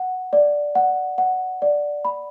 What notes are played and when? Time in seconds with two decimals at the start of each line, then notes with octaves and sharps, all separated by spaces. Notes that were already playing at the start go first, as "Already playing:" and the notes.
Already playing: F#5
0.33 D5
0.75 F#5
1.18 F#5
1.62 D5
2.05 B5